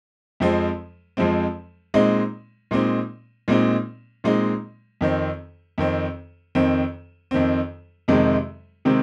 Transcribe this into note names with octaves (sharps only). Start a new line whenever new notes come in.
F2 F3 G#3 C4
F2 F3 G#3 C4
A#2 G#3 C4 D#4
A#2 G#3 C4 D#4
A#2 G#3 C4 D#4
A#2 G#3 C4 D#4
F2 D#3 C4
F2 D#3 C4
F2 D#3 C4
F2 D#3 C4
F2 C3 D#3 G#3 C4
C3 D#3 G#3 C4